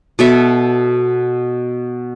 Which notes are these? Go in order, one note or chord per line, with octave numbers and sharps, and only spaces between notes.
B2 A4 E5